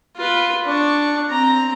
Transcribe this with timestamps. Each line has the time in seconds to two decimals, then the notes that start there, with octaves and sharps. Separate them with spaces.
0.17 F4 B4
0.66 D4 C#6
1.30 C4 A#5